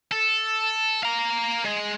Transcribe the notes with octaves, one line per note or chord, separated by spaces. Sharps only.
A4
F5 A#5
G#3